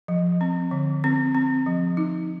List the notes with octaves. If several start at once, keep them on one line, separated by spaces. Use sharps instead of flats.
F3
C4
D3
C4
C4
F3
D#4